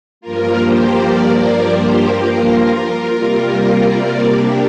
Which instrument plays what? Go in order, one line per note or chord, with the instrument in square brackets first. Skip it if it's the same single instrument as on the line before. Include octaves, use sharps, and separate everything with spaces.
[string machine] G2 F3 A#3 F4 A#4
G4 C5
A#4 D5
A#4 D5
G4 C5
F4 A#4
C3 G3 A#3
A#4 D5
D4 G4